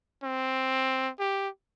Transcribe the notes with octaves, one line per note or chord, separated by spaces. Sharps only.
C4
G4